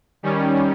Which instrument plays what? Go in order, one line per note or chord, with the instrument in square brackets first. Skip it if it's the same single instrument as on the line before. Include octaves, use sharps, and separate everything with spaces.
[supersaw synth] D#3 G3 C#4